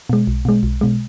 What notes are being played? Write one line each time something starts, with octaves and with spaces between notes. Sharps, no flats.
B2 G#3
B1
B2 G#3
B1
B2 G#3